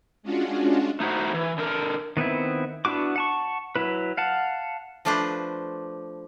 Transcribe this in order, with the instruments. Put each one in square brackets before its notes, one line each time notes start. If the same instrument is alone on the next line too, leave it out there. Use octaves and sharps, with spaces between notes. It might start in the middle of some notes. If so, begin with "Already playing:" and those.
[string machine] G#3 C#4 D4 F4 F#4
[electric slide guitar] A3 D#4 E4 F#4 C5
E3
D3 A#4
[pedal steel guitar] D#3 B3 C4 E4
B3 D4 E4 F#4 D6
F#5 A5 C#6
F#3 E4 B4
F5 F#5 A5
[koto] F3 A3 D4 B4 C5